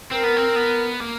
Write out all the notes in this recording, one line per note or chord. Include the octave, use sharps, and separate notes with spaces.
C4 A#4
B3
C4
B3
A#3